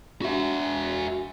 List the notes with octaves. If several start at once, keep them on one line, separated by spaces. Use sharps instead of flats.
F#4 E5